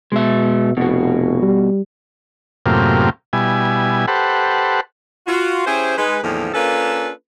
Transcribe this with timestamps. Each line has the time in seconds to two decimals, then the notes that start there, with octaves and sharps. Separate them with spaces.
0.12 B2 G#3 E5
0.77 F1 B2 F#4
1.42 G3
2.66 F#2 A2 C3 A#3 F4 G4
3.33 B2 G3 E4 G#5
4.08 G4 A4 B4 C5 F#5
5.27 F4 F#4
5.66 C#4 E4 G4 G#4 C5
5.97 G#3 D#4 B4
6.23 E2 A2 D3 D#3 F3 A#3
6.54 A#3 C#4 D4 F4 A4 B4